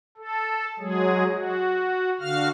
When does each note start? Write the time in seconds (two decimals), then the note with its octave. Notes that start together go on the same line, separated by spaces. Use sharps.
0.17 A4
0.79 F#3 G#3 G#4
1.32 F#4
2.20 D3 F#4 F5 F6